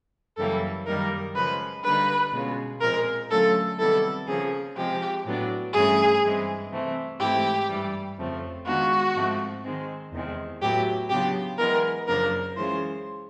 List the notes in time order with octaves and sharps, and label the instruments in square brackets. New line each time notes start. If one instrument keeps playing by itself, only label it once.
[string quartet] F#2 C#3 E3 G3 A#3 [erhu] A4
[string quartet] F#2 D#3 G3 A#3 D#4 [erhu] A#4
[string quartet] C#3 F3 G#3 [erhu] B4
[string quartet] D3 G3 A#3 D#4 [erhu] B4
[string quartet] B2 G#3 C#4 F4
[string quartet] A#2 F3 G#3 C4 [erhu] A#4
[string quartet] D3 F#3 A3 C#4 F4 [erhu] A4
[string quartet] C3 D#3 G3 B3 E4 [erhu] A4
[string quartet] C#3 F3 A#3 C#4 [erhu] G#4
[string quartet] C3 F3 G#3 [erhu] G4
[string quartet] A2 F#3 B3 D4
[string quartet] G2 E3 A3 C#4 E4 [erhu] G#4
[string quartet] G2 E3 G#3 C4
C3 E3 A3 C4
[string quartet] G#2 E3 A3 C4 E4 [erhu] G4
[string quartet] G2 E3 G3
F2 C#3 F3 A3 C4
[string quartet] D#3 G#3 B3 D4 F4 [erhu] F#4
[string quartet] G#2 F3 A3 C4
D#3 G#3 C4
E2 C3 D#3 G#3 C4
[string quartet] A2 F#3 B3 E4 [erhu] G4
[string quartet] C#3 F#3 B3 D4 F4 [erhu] G4
[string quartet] E3 G#3 B3 [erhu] A#4
[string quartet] F#2 C#3 F3 A#3 D4 [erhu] A#4
[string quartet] E3 G#3 C#4 F4 [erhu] C5